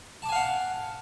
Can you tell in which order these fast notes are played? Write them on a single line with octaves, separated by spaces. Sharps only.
A5 D6 G#5 F5 F#5